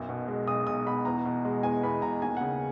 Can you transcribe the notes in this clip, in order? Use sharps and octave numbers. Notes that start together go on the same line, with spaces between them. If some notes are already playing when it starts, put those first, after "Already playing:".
Already playing: B1 F#2
B2
G#3
B1 D#6
B1 D#6
B2 B5
E2 A#5
B2
G#3
E2 G#5
E2 B5
B2 A#5
D#2 G#5
C#3 F#5